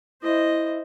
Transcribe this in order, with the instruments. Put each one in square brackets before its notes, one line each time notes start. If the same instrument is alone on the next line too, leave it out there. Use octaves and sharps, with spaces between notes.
[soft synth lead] E4 [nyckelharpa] C5 D#5